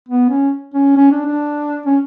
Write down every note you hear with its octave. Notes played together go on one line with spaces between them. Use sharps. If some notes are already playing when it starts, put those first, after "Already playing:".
B3
C#4
C#4
C#4
D4
D4
C#4